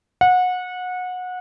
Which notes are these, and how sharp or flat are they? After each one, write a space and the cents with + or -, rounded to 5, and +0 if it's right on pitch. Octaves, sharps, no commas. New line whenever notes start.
F#5 -25